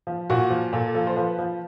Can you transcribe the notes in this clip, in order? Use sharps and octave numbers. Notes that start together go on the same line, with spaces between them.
F3
A#2 F#4
F3
A#2 A4
F3 A4
C5
F3 B4
F3